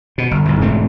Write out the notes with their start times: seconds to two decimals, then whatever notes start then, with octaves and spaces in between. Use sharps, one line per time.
0.18 B2
0.31 G1
0.45 G1 C2
0.61 E1 G#2 A3 C4